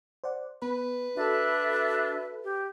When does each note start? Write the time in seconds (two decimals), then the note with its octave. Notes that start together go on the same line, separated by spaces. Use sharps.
0.24 C5 D5 F#5
0.62 B3 B4
1.17 D4 F#4 A4 E5
2.44 G4